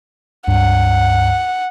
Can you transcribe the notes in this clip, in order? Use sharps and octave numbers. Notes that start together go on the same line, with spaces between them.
C#2 G2 F#5